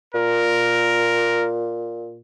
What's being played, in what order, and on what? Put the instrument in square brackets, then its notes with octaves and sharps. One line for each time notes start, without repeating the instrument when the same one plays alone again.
[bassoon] A#2 [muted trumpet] A#4